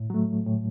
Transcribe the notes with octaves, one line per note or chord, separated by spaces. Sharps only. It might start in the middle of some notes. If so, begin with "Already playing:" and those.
Already playing: A2
F#3 A3
A2